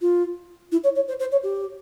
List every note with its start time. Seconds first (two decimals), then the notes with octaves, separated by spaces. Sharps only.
0.01 F4
0.72 E4
0.83 C#5
0.95 C#5
1.08 C5
1.19 C5
1.31 C#5
1.43 G4